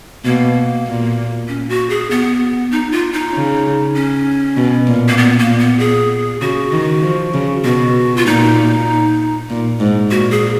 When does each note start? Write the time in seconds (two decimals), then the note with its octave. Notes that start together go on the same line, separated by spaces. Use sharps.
0.25 B2 A#3
0.87 A#2
1.48 C#4
1.69 F#4
1.90 G#4
2.11 B3
2.71 D#4
2.92 F4
3.13 D#4
3.33 C#3
3.95 C#4
4.56 B2
4.87 A#2
5.09 A#3
5.17 A#2 B3
5.39 A#3
5.49 A#2
5.59 B3
5.79 G#4
6.41 C#3 F#4
6.72 D#3
7.02 F3
7.34 C#3
7.64 B2 F#4
8.17 F4
8.26 A#2 D#4
9.50 A#2
9.80 G#2
10.10 A#2 F#4
10.31 G#4